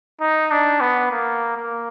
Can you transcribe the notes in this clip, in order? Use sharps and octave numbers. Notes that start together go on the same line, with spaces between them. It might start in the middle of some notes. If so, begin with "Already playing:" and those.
D#4
D4
B3
A#3
A#3